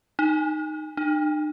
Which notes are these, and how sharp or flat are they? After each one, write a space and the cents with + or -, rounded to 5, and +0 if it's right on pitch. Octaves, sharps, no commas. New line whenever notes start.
D#4 -10
D#4 -45